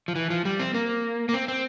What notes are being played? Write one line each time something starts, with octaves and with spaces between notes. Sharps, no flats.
F3
E3
F3
G3
C4
A#3
A#3
C4
C4